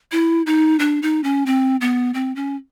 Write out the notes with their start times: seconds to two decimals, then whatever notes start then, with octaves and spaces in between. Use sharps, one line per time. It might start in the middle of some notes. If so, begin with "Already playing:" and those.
0.12 E4
0.46 D#4
0.79 D4
1.02 D#4
1.24 C#4
1.46 C4
1.81 B3
2.14 C4
2.36 C#4